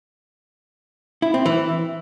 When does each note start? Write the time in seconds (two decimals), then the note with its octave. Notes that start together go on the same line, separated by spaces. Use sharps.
1.22 E4
1.34 C4
1.46 E3